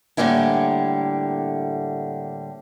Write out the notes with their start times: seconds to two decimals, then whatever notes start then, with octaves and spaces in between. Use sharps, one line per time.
0.17 A2 D3 G3 A#3 E4 G#5